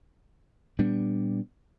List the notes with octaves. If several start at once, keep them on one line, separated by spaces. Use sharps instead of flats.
A#2 G3 B3 D4